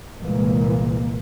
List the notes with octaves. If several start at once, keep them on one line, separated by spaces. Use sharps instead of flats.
F1 C2 A#2 E3 G#3 A#3